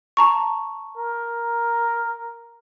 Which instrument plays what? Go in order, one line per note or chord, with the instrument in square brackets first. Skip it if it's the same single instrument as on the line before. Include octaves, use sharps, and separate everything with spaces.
[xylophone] A5 A#5 C#6
[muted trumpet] A#4